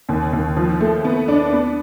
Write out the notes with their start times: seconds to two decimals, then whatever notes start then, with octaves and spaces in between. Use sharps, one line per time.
0.09 D#2
0.33 D#2
0.56 F3
0.81 A3
1.05 B3
1.28 D4
1.52 B3